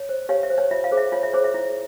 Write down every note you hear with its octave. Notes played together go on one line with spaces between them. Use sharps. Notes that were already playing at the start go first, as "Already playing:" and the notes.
Already playing: C#5
C5
G4 C#5 F5
E5
C5
C#5
F4 E5
F5
G#4 C5
E5
F4 C#5
E5
G#4 C5 C#5
E5
E4